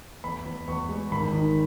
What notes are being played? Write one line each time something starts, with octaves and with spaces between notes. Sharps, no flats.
E2 B5
E2
E2 C#6
G#3
G#1 B5
D#3